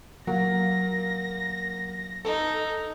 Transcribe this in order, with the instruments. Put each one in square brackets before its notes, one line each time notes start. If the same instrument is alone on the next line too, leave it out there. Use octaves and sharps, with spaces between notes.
[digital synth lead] F#3 [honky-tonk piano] A#3 [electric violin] A#6
[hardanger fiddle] D#4 [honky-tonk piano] A4